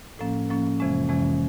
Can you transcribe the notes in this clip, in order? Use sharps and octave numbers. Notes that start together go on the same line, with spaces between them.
A2 F3 A#3 C#4
A2 F3 A#3 C#4
F2 C3 E3 G#3 C#4
F2 C3 E3 G#3 C#4